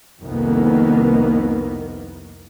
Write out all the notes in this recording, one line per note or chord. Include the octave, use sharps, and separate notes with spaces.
C2 F2 D#3 A#3 B3